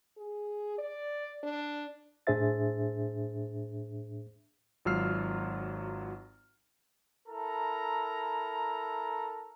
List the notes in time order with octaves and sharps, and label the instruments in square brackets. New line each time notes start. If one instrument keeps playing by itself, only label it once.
[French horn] G#4
D5
D4
[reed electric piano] A2 D4 G#4 C5 E5 A6
[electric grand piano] G#1 F#3 F4 E6 F6 C7
[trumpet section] E4 A4 A#4 A#5